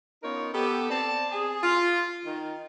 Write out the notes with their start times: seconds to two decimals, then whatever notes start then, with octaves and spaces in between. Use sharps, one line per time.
0.22 B3 C#4 D#4 F4 A#4 C#5
0.54 B3 G4 A4
0.90 C4 D5 A5
1.31 G#4
1.63 F4
2.25 D#3